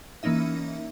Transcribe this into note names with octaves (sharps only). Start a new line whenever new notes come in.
E3 A#3 C#4 D#4 E5